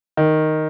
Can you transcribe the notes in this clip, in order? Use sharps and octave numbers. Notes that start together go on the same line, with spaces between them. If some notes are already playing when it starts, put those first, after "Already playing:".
D#3